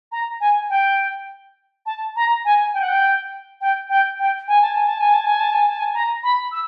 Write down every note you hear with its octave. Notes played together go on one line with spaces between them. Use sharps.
A#5
G#5
G5
A5
A#5
G#5
G5
F#5
G5
G5
G5
G5
G#5
A5
G#5
A5
G#5
A5
G#5
A5
G#5
A5
G#5
A#5
B5
E6